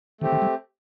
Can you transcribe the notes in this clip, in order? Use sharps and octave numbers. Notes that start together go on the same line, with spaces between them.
D#3 A3 C4 G4
D#3
G3